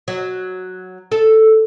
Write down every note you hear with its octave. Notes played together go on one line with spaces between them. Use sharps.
F#3
A4